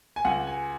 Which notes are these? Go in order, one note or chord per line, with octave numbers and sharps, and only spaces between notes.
G#5
C#2 F#5
G#5